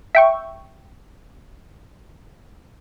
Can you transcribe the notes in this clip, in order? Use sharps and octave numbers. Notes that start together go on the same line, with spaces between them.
E5 G5 C#6